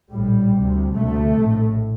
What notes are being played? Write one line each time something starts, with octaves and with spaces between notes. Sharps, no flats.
A#1 A2 G3
D2 C3
D2 C3 A3
A#1 A2